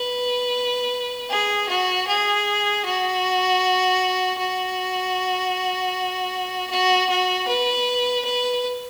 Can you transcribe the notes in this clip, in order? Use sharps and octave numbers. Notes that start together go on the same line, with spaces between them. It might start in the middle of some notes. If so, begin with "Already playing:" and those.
Already playing: B4
G#4
F#4
G#4
F#4
F#4
F#4
F#4
B4
B4